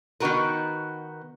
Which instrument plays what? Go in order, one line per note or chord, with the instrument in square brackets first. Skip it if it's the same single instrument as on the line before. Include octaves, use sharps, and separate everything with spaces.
[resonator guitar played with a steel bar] D#3 B3 D#4 F#4 A#4 B4